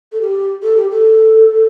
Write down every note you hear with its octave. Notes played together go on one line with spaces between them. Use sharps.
A4
G4
A4
G4
A4